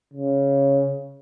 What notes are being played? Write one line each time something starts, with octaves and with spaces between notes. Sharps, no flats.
C#3